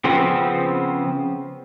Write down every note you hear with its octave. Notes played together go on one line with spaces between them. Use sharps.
C#3 F3 B3 C4